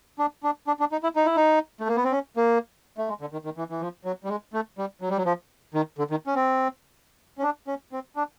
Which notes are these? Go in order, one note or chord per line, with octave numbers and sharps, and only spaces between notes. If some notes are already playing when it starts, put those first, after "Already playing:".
D4
D4
D4
D4
D#4
E4
D#4
E4
D#4
A3
A#3
B3
C4
C#4
A#3
A3
G#3
D3
D#3
D#3
E3
E3
F3
F#3
G3
G#3
A3
G3
F#3
G3
F#3
F3
D#3
D3
D#3
C#4
C4
C#4
D4
C#4
C4
D4